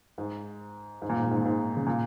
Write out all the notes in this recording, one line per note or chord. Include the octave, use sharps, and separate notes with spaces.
G#2
G#2
A#2
G#2
A#2
G#2
A#2
G#2
C#3
A#2